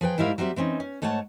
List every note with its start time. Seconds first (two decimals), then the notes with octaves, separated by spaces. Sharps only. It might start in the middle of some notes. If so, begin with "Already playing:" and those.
0.01 F3 G#4 B4 G5
0.18 G#2 G3 E4 A#4 E5 F5
0.38 F#3 G3 C4 E5
0.56 E3 C4 C#4 D#4
0.80 C#4
1.02 G#2 A3 C#5 F#5 A5